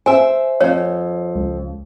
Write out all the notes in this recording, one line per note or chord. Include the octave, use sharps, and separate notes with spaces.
C5 E5 G#5
F2 C#5
C#2